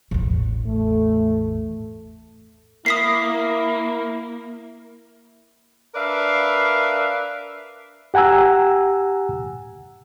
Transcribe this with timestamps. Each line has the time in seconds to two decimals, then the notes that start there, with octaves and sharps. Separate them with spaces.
0.11 A1 E2
0.67 A3
2.86 A#3 E4 D#6 B6 C7
5.95 D4 A#4 B4 D5 E5 F5
8.14 G4 F#5 G#5 A#5 E6